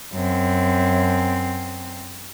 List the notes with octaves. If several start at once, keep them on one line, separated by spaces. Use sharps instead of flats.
F#2 C4